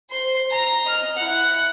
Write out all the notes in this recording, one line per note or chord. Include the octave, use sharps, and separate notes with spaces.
C5 C6
A#5
D#5 F6
E4 F#5